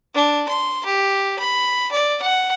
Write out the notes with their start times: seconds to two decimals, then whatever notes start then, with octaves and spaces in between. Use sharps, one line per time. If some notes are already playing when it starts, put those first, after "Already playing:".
0.15 D4
0.48 C6
0.86 G4
1.39 B5
1.92 D5
2.22 F#5